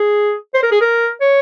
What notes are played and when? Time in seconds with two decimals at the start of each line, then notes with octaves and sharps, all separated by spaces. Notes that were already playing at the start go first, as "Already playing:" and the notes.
Already playing: G#4
0.54 C5
0.63 A#4
0.72 G#4
0.81 A#4
1.21 C#5